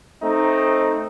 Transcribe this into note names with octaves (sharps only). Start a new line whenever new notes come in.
A3 C4 D#4